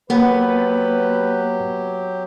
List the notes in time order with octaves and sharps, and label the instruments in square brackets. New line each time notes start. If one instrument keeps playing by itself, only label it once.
[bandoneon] F#3 G4 [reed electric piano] A#3 [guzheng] B3 [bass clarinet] B4